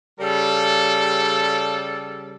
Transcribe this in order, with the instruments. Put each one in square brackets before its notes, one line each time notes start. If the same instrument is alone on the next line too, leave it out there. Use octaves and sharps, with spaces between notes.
[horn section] C#3 G3 A4